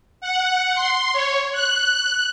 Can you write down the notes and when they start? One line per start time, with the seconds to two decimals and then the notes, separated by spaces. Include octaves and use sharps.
0.21 F#5
0.75 C6
1.13 C#5
1.52 F#6